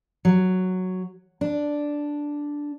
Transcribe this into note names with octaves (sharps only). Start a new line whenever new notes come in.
F#3
D4